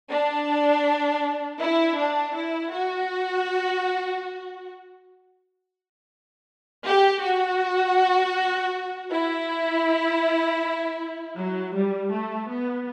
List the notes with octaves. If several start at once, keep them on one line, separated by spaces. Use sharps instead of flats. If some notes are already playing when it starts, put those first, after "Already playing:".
D4
E4
D4
E4
F#4
G4
F#4
E4
F#3
G3
A3
B3